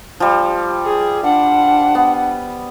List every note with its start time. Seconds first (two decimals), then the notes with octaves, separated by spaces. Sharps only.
0.20 F3 G3
0.85 G#4
1.24 D4 F#5
1.95 B3